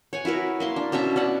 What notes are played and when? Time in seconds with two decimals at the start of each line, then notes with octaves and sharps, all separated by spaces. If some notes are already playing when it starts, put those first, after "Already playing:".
0.13 C#5 F#5 G#5
0.25 E4 F#4 A#4 B4
0.60 A#3 E4 C6
0.76 D4
0.92 B2 C#4 D4 E5
1.16 C#4 D5 F#5